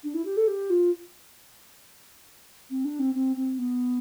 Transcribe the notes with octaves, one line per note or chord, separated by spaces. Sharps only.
D4
E4
G4
A4
G4
F4
C4
D4
C4
C4
C4
B3